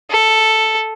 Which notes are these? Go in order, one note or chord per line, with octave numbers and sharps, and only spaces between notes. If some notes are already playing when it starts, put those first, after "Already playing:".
A4